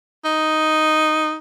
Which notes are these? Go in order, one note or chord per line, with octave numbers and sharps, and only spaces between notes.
D#4